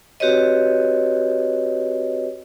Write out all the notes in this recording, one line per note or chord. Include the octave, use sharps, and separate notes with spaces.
C4 F#4 G4 B4 C#5 D#5